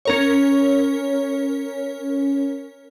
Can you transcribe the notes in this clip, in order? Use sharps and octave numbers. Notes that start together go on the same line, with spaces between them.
C#4 A#4 C#5